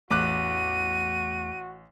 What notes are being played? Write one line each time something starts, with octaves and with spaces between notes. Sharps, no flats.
A1 E2 A3 F#4 D6 F#6 D#7